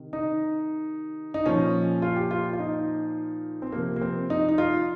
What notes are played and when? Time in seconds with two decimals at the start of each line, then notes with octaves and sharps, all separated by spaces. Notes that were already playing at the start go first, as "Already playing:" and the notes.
Already playing: C3 D#3
0.13 D#4
1.34 D#4
1.46 A#2 F3 C#4
2.02 F4
2.16 G4
2.31 F4
2.53 F4
2.59 D#4
3.62 C4
3.72 C3 F3 A#3
3.96 A#3
4.01 C4
4.30 D#4
4.49 D#4
4.58 F4